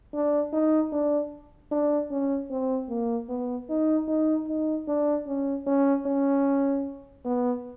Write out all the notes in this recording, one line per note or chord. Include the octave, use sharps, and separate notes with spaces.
D4
D#4
D4
D4
C#4
C4
A#3
B3
D#4
D#4
D#4
D4
C#4
C#4
C#4
B3